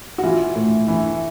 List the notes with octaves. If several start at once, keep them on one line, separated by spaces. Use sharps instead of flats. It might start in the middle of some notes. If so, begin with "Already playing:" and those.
F#4
E3 F4
A2
E3